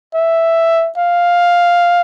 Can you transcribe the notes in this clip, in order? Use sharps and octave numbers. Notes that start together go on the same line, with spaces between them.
E5
F5